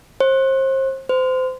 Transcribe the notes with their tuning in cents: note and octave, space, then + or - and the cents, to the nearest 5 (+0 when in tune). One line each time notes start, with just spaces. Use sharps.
C5 +35
C5 -30